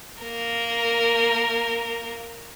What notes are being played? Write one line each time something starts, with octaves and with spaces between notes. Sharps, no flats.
A#3 A#4